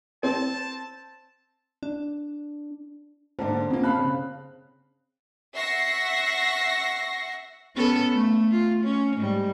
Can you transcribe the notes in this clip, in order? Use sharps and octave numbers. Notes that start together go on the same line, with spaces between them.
C4 A5
D4
G#2 D3 A#3 D4 A4 C5
C#3 F3 A#3 C4
F5 A5 B5 F#6
C#3
E5 F#5 C#6 A#6 C7
B3 C#4 A4
A3
F4
C#4
G#2 G3